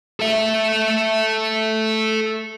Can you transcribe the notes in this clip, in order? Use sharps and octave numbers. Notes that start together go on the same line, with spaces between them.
A4 E5